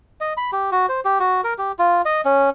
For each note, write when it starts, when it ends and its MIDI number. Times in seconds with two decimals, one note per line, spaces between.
0.21 0.33 75
0.37 0.51 83
0.52 0.70 67
0.72 0.86 66
0.89 1.00 72
1.05 1.19 67
1.20 1.41 66
1.44 1.54 70
1.58 1.72 67
1.79 2.02 65
2.05 2.21 75
2.25 2.50 61